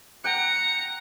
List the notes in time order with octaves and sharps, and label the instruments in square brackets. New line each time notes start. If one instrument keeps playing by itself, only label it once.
[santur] F#5 G5 [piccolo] A#5 [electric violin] C#7